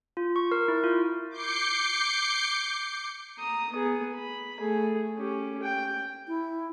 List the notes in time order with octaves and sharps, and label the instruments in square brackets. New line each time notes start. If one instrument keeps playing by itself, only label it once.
[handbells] F4
C#6
A#4
E4
F4
[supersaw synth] D6 G6 C7 C#7
[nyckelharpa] A#5 D#6
B3 G#4
B5
A3 G#4
C#4 G4
G5
[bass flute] E4